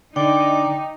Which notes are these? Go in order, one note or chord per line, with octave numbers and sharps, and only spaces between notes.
D3 D#4 D5 G5